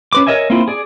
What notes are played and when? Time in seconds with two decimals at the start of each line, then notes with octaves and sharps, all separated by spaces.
0.13 C#4 B4 D6
0.27 A#4 C#5 D#5 E5 G#5
0.50 A#3 C4 E4 F4
0.68 G#4 D5